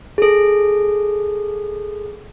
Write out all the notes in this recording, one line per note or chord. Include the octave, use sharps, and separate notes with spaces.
G#4 A4